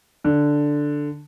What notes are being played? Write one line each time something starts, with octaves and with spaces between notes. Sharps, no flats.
D3